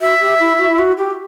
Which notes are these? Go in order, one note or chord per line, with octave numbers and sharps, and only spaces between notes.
F#4 E5
G4
E4
F#4
E4
F#4
G4